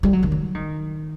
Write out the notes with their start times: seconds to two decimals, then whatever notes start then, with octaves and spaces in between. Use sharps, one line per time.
0.03 G3
0.13 F#3
0.23 D#3
0.32 F#3
0.55 D#3